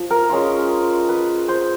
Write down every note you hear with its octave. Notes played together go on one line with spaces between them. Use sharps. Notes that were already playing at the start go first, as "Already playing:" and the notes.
Already playing: F3
A#4
G#3 C#4 F4
B4
C5